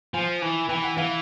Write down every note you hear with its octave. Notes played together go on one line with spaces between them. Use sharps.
F3 G#5
E3
E3 G5
F#5
E3 F5